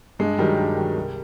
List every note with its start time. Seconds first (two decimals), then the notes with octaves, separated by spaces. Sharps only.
0.19 G2 G#3
0.38 D#3 F#3 G3
0.57 G2
0.77 D#3 F#3
0.96 C2